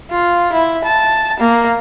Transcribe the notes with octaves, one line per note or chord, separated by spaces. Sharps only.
F4
E4
A5
A#3